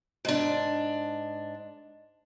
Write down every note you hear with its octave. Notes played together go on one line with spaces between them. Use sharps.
G#2 D4